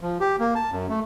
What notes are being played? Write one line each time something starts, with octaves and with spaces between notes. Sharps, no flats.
F3
G4
A#3
A5
F#2
A3